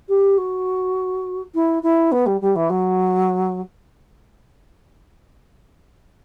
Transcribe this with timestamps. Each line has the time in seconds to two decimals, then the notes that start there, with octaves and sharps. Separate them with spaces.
0.09 G4
0.38 F#4
1.55 E4
1.83 E4
2.12 B3
2.26 G3
2.41 G3
2.56 E3
2.70 F#3